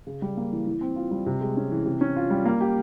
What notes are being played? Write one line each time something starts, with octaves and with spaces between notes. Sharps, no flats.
C#3
G3
A#3
E3
E3
C4
F4
G3
C3
G#3
C#4
E3
C3
C#4
F4
G3
A#3
G4